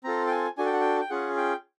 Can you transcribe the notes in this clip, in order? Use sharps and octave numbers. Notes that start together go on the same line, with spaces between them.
C4 F4 A4 A#5
G5
G#5
D4 F#4 A4 G#5
G5
F#5
G5
G5
C#4 F4 G#4 F#5
G5